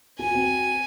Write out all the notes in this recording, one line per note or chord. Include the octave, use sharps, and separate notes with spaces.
F#4 G#5
C4